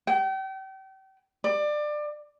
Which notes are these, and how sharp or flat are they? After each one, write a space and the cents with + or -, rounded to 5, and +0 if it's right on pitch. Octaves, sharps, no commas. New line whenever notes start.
G5 -35
D5 +25